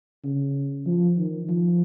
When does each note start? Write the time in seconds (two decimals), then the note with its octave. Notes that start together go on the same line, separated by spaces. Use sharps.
0.24 C#3
0.87 F3
1.17 D#3
1.49 F3